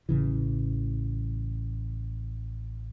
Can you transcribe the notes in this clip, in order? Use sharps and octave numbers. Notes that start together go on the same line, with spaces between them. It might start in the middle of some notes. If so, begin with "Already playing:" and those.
A1 C#3 E3